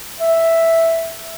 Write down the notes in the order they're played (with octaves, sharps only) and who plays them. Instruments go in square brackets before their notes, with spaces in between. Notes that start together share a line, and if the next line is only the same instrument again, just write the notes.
[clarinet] E5